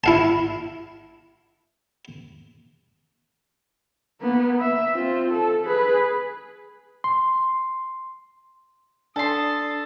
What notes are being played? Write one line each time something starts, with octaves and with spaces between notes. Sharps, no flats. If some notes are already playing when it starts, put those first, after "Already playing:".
E4 F5 A5
A#3 B3
E5
C4 F4
A4
G#4 B4
C6
D4 A4 D5 A5 C6 D#6 B6